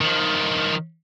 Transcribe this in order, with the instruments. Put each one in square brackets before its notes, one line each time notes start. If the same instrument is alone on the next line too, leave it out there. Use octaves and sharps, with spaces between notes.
[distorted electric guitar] D#3 F3